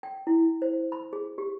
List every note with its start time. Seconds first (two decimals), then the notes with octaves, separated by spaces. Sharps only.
0.03 G5
0.27 E4
0.62 C5
0.92 B5
1.13 G#4
1.38 G4